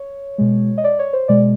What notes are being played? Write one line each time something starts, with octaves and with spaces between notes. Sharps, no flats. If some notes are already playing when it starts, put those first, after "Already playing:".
Already playing: C#5
B2 G#3
D#5
D5
C#5
C5
B2 G#3 D5